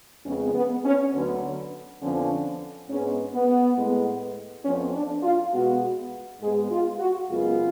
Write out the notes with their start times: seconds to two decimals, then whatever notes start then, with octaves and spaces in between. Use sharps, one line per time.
0.25 F2 C#3 G#3 B3 C#4
0.54 B3
0.84 C#4
1.13 D2 D3 F#3 B3
2.01 F2 D3 F3 B3 C#4
2.89 G#2 G#3 B3 C#4
3.33 B3
3.77 A2 G#3 B3
4.64 F2 F3 B3 C#4
4.94 D4
5.23 F4
5.53 B2 G#3 B3 F#4
6.40 G#2 G#3 B3 G#4
6.70 F4
6.99 F#4
7.28 F#2 C#3 G#3 B3 F4